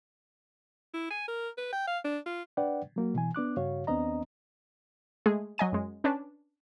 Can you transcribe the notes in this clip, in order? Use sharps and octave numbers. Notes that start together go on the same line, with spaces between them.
E4
G#5
A#4
B4
G5
F5
D4
F4
D4 B4 D5 F#5 G5
F#3 A#3 F#4
B2 E3 G#5
B3 D4 D6 F#6
G2 C#3 F#4 C#5 F5
D#2 B3 C4 D4 D#5 A#5
G#3 A3 G#4
F#3 D#5 G#5 D#7
F#2 G#3
C#4 D4 B4 C#5 A5